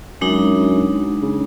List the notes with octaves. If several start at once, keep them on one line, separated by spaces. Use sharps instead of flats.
F#2 G#3 D4 D#4
C#3